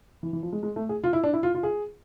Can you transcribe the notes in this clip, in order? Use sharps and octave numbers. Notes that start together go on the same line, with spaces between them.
E3
E3
F3
G#3
G#3
A3
G#4
F4
E4
D4
E4
F4
F4
G#4